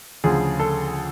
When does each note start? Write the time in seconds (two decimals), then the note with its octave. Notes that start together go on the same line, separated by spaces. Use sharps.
0.24 D2 C#3 F3 G#4
0.60 A4